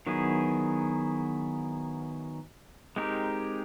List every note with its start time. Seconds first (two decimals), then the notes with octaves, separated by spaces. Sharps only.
0.07 D#3 F#3 B3 E4 G#4
2.96 G#3 C4 D#4 G4 A#4